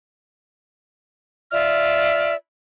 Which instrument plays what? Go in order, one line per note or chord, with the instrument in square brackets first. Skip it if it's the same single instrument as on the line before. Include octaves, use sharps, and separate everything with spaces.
[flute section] F4 D5 E5 F6